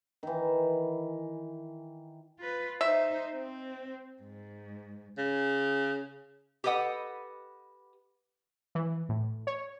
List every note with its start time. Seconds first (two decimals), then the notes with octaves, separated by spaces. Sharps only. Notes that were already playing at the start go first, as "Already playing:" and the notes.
0.23 D#3 E3
2.39 F4 B4
2.81 D#4 C5 E5
3.33 C4
4.22 G#2
5.18 C#3
6.64 G4 A4 B4 D#5 F#5
8.75 E3
9.09 A2
9.47 C#5